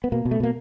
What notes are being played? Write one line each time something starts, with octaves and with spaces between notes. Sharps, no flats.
B3
B2 A#3
B2
A3
B2 A#3